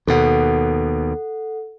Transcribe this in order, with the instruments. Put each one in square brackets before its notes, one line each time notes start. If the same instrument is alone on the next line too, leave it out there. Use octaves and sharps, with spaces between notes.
[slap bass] D#2 B2 [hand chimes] A4 F#5